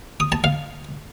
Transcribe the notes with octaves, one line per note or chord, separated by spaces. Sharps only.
D#6
A5
F5